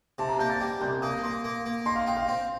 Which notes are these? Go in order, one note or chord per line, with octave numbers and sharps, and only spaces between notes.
C3 A5
A#5
A#3 G6
A6
G3
C2 G6
A#3 D#6
A#3 C6
A#3
A#3
D#4 C6
F5
D#4 G5
F5
C4